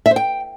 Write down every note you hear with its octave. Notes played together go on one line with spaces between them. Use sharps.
E5
C5
G5